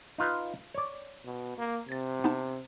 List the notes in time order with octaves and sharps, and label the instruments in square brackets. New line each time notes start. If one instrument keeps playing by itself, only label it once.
[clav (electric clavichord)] D#4 F4 B4
C#5 D5
[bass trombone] B2
A#3
[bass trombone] C3 [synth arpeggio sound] G#6 A6
[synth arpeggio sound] B3 D#4 A5